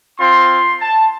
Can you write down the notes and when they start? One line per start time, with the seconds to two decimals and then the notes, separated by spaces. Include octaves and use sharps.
0.19 C4 F4 C6
0.80 A5